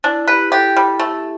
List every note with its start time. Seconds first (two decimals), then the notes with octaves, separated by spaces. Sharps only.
0.04 D4 E4
0.28 G4 B4
0.52 G4 A4
0.76 G3
0.99 A3